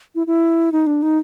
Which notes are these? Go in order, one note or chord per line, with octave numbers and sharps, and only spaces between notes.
E4
E4
D#4
D4
D#4